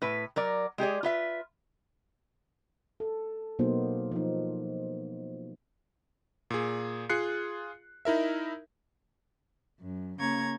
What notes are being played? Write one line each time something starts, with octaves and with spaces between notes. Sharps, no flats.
A2 B4
F#3 A#4 D5
G#3 G4 G#4 D5
F4 B4 E5
A4
B2 F#3 A#3 B3 D#4 C5
F3 D#4
A#2 G#4
F4 G#4 F#6 C7 C#7
D#4 E4 A#4 E5
F#2
C#3 A#3 C#4 A#5 C#6 G#6